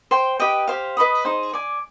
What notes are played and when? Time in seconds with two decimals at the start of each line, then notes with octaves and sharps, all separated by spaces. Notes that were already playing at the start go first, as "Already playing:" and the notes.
0.11 C5 G5 C6
0.40 G4 B4 D#5 G5
0.67 G4 C5 F5
0.97 B4 D#5 B5 D#6
1.25 D#4 G#4 C5
1.53 D5 G#5 D6